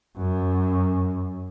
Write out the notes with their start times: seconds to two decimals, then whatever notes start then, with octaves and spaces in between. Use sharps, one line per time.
0.17 F#2